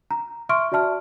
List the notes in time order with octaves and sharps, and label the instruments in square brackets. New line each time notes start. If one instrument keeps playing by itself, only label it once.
[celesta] A#5
E5 C6 C#6 F6 D7
F#4 D5 E5 A5 F6